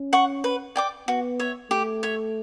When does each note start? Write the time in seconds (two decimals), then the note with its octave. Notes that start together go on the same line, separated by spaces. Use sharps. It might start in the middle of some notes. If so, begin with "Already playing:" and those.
Already playing: C#4
0.13 F#5 C#6
0.44 B4
0.76 D5 G5 D6
1.08 B3 F#4
1.40 C#5 E5
1.70 A3 G4
2.03 C#5 E5